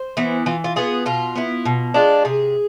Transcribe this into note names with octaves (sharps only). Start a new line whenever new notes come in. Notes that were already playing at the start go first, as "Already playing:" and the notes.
Already playing: C5
E3 B3 E4
E3 F4
F4
B3 F4 G#4
B2 F4
B3 E4
B2
G#3 D4 F4
C3 G#4